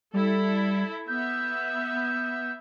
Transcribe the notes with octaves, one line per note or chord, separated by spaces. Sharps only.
G3 E4 A4
B3 E5 G6